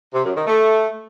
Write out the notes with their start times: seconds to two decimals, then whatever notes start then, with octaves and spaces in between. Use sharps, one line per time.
0.14 C3
0.25 F#2
0.36 D#3
0.47 A3